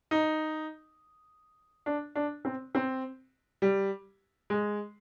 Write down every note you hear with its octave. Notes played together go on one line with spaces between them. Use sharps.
D#4
D4
D4
C4
C4
G3
G#3